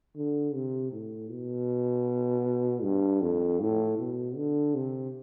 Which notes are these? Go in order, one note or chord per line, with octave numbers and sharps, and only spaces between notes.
D3
C3
A2
B2
G2
F2
A2
B2
D3
C3